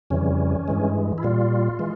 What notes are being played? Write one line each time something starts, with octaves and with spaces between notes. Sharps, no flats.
F2 C#3 E3 G3 C#4
G2 E3 G#3
E4
A#2 G3 F4
E3 G#3